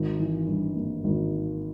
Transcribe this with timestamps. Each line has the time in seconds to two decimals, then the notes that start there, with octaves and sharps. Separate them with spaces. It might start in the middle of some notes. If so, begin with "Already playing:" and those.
Already playing: G#1
0.19 E3
0.47 G2
0.76 A#3
1.04 G#1